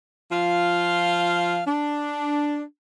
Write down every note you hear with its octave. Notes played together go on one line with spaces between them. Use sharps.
F3 F4 F5
D4